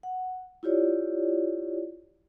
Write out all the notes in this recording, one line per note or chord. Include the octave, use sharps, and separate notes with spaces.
F#5
E4 F4 G4 C#5 D5